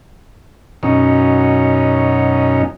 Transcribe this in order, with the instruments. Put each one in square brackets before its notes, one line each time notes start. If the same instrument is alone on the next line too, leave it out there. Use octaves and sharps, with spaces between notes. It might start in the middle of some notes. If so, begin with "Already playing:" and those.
[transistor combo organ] F#2 B2 C#4 D#4